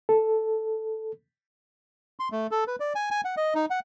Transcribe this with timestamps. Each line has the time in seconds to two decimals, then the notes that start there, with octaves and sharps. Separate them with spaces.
0.09 A4
2.20 C6
2.32 A3
2.51 A4
2.67 B4
2.80 D5
2.95 G#5
3.11 G#5
3.25 F#5
3.37 D#5
3.55 D#4
3.70 F#5